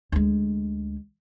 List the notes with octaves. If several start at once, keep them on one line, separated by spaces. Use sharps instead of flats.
D2 G#3